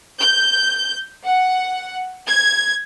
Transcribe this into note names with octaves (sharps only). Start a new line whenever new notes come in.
G6
F#5
G#6